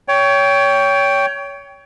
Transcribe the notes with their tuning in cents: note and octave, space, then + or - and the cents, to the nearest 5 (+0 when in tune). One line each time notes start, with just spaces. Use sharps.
C#5 +25 G5 +0